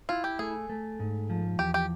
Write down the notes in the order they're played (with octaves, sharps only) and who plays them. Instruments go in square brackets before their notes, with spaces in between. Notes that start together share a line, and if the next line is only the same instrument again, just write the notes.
[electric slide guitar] E4 [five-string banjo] F4
[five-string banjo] G4
[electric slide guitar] A3 [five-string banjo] G#4
[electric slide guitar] A3
G#2
F3
[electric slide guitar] E2 [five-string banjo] G4
[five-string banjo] G4